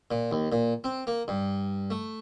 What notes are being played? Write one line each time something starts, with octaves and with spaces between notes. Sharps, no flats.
A#2
D#2
A#2
C4
A#3
G2
A3